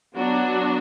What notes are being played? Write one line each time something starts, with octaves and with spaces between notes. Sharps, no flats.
F#3 B3 D4 F#4